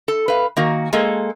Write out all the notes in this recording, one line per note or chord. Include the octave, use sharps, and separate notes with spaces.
A4
B4 F5
D#3 A#3 F#4
G#3 A#3 G#4 A4